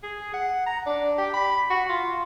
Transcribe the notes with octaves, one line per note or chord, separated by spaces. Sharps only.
G#4
F#5
A#5
D4
G4
B5
F#4
F4